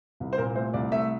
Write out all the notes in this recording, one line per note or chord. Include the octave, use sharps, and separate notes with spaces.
C2
C5
A#2 A#4
A3 C5
C2 D5
A3 E5